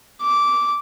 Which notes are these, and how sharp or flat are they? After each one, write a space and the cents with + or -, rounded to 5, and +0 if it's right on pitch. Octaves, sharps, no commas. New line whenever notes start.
D6 -10